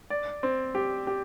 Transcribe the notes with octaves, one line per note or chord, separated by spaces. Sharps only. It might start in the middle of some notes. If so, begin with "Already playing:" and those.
D5
C4
G4
G4